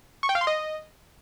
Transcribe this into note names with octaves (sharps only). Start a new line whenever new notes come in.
C#6
G5
F5
C6
D#5